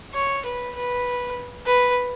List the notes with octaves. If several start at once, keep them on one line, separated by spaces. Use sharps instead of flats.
C#5
B4
B4
B4